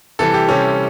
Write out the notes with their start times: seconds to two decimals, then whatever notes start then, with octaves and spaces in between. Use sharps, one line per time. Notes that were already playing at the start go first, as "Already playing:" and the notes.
0.19 C3 E3 G3 A4
0.34 G4
0.49 C3 E3 G3 C#4